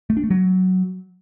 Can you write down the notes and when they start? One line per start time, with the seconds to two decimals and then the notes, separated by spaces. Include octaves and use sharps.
0.10 A3
0.17 D4
0.24 A3
0.30 F#3